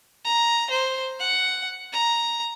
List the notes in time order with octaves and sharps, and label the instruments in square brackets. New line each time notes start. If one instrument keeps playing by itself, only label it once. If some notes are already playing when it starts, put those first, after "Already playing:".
[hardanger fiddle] A#5
C5
F#5
A#5